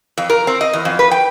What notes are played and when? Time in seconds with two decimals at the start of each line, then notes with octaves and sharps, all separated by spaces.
0.18 F2
0.30 A#4
0.47 C4
0.61 D#5
0.73 E2
0.85 F2
0.99 B4
1.11 G5